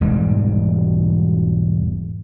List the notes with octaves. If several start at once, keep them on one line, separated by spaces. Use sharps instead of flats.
E1 G#2 E3 G3